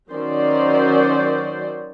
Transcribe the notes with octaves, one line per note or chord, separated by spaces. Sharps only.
D#3 F#3 C#4 C5 D5